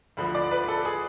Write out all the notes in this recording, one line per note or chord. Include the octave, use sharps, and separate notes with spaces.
D2 D3 F3 B5
D5
B4
A4
G#4